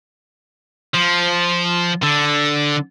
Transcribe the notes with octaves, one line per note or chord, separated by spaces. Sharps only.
F3
D3